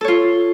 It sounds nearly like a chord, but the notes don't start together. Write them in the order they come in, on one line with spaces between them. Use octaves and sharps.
A4 C#5 F4